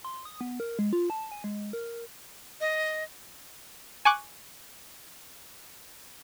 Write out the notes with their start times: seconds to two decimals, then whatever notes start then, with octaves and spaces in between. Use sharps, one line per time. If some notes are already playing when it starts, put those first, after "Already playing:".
0.05 C6
0.25 D#6
0.41 B3
0.60 A#4
0.79 G#3
0.93 F4
1.10 A5
1.32 G#5
1.44 G#3
1.73 A#4
2.61 D#5
4.05 G#5 C#6 D6 F#6